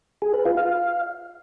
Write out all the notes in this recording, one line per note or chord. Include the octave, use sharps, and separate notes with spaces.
G#4
B4
F4
F5